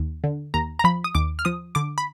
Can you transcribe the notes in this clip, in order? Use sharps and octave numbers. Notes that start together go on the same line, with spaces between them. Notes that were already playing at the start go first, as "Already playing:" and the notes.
Already playing: D#2
D3
D#2 A#5
A#5
F3 B5
D#6
D#2 D6
F6
F3 D#6
D3 D6
B5